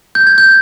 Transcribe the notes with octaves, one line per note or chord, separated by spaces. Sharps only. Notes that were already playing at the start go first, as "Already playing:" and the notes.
G6
G#6
G6